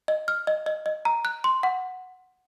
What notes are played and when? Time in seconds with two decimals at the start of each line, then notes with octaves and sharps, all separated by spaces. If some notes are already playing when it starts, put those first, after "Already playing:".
0.08 D#5
0.28 F6
0.47 D#5
0.66 D#5
0.86 D#5
1.05 A#5
1.25 F#6
1.44 C6
1.63 F#5